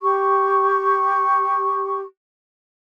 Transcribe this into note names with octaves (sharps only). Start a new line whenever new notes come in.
G4 C#6